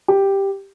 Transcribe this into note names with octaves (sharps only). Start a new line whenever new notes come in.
G4